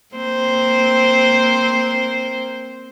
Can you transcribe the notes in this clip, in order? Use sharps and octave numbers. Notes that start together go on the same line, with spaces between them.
A#3 C4 C5